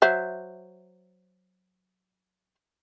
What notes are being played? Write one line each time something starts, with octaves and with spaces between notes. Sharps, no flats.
F#3 C5 E5